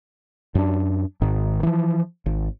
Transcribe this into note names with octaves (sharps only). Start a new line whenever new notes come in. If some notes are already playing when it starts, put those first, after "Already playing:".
F#2 D4
G#1 G#2 D#3
E3 F3
G#1